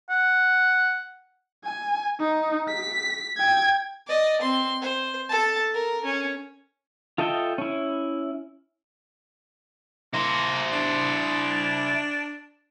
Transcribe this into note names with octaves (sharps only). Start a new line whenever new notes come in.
F#5
G#5
D#4
B6
G5 G#6
D5 D#5
C4 C6
C5
A4 A5
A#4
C#4
F4 A4 D#5 E5 G5
C#4 E4
A#3 E4 C5
D4